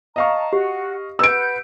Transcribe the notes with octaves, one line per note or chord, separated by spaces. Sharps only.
D#5 F5 A5 A#5 C#6
F#4 G4
B4 F#5 E6 G6 D7